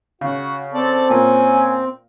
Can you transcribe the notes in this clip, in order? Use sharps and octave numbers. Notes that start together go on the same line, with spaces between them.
C#3 F#4
C4 A4 D5
A#2 C#4 G#5